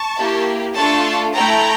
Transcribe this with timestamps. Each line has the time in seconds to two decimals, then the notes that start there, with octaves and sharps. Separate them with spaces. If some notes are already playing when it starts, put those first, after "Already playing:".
Already playing: A5 C#6
0.18 A#3 E4 G4
0.75 A3 D4 F4 A4 A5 C#6
1.34 A3 E4 A4 G5 A#5